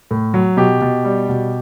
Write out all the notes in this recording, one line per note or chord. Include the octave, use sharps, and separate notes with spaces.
A2
F#3
B2 G4
B2
G3
B2